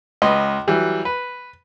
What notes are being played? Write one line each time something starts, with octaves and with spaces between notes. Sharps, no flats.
C#2 B4 D#5 C6
E3 F#3 G3
B4